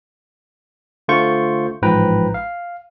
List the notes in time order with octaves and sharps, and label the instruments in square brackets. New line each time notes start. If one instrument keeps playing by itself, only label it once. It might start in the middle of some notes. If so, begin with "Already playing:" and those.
[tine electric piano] D3 A3 F4 C5 C#6 G6
A1 G#2 F3 B4 G5 A#5
F5